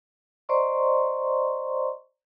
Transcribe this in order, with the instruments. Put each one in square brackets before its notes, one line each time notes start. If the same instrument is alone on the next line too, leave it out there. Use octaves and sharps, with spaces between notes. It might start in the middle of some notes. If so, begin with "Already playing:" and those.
[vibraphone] C5 D5 D#5 A#5 C6 C#6